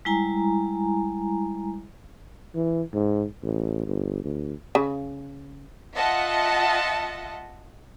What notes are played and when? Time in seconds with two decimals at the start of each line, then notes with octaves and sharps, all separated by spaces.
0.05 G3 G#3 E4 G#5 A#5
2.55 E3
2.93 G#2
3.42 A1
3.86 G1
4.24 D2
4.75 C#3
5.95 F4 D#5 E5 F#5 A5